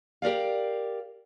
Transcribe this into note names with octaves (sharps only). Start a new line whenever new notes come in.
G4 A#4 D5 F5